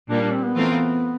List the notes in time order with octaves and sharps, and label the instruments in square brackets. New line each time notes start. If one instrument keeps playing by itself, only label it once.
[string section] A#2 G3 A#3 [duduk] D4
[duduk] D4
C4
B3
[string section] E3 A3 C4 F4 A#4